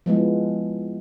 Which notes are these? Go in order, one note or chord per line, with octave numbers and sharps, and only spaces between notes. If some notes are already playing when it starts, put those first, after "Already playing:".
F3 G#3 B3 E4